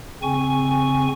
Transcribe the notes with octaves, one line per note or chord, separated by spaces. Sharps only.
C#3 C4 G#5 C#6